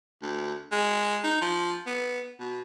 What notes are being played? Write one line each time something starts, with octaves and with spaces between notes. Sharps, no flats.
D2
G#3
D#4
F3
B3
B2